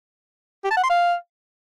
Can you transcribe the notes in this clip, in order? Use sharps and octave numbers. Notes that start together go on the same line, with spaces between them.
G4
A5
F#5
C6
F5